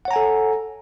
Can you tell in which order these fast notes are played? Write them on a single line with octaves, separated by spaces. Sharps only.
F#5 C#5 A#5 G#5 A4